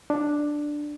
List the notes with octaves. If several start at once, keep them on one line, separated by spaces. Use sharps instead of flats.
D4